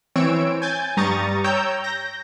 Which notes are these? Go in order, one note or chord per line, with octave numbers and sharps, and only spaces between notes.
E3 C4 C#5 E6 D7
G#5 G6 A6
G2 G3 A#5 C#6 D#6 A6
C#5 G5 A#5 E6 G6
G6 A#6